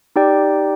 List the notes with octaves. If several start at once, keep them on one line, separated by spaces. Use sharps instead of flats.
D#4 G4 D5 G5